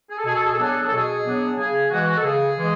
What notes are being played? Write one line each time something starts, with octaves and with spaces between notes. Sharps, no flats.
G#4
A4
B2 G#4
A4
G#4
A4
F#3 B3 D4 G#4
A4
G#4
A4
B2 G#4
F#3 B3 D4
C#3 G#4
E3 G#3 F#4
A4
C#3 G#4
E3 G#3